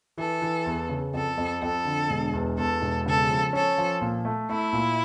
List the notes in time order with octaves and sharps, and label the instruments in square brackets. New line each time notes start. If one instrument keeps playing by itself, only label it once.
[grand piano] E3 [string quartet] A4
[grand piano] E3
E2
C#3
[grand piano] F2 [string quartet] A4
[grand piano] F2
[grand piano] F2 [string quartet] A4
[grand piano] D3
E1
E2
[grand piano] E2 [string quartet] A4
[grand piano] E1
[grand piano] C#3 [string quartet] A4
[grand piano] F3
[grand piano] C#4 [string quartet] A4
[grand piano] F3
A#2
A3
[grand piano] A3 [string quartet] E4
[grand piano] A#2